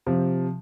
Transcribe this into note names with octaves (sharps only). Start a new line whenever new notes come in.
C3 F3